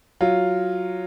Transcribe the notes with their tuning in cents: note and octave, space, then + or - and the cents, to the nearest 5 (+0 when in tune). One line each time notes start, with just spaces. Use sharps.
F#3 +0 F4 +0